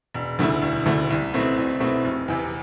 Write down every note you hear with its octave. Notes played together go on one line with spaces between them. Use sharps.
E1
D2 D3 A3 E4
E1
D2 D3 A3 E4
C2
B2 A3 C4 E4
C2
B2 A3 C4 E4
F1
E2 C3